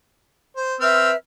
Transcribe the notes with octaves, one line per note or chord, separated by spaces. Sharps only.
C5
C4 B4 E5 E6 F6